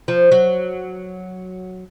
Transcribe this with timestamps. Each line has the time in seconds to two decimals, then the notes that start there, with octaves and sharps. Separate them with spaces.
0.08 F3
0.32 F#3